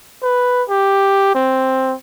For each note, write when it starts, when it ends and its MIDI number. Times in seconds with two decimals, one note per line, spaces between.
0.23 0.63 71
0.69 1.31 67
1.35 1.95 60